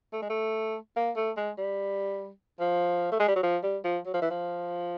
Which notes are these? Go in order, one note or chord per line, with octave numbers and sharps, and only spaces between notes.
A3
G#3
A3
A#3
A3
G#3
G3
F3
A3
G#3
G3
F#3
F3
G3
F3
F#3
F3
E3
F3